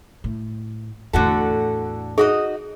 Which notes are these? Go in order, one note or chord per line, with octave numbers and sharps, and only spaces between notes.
A2
E2 A2 D3 F#4 A4
D#4 F#4 G#4 D#5